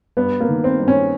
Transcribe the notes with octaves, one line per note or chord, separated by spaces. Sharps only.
G2 B3
A#3
D#3
C4
G2
C#4